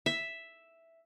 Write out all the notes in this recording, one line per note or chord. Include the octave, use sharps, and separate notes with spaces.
E5